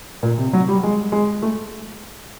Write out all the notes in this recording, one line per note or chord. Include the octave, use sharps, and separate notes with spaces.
A#2
C3
F#3
G3
G#3
G#3
A3